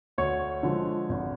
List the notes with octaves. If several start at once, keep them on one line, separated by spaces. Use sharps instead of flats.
D2 C#5
D3 F3 G#3
G#1